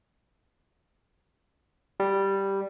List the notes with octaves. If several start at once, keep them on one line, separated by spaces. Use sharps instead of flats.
G3